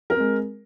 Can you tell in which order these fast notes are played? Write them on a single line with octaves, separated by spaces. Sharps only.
A#4 C4 G#3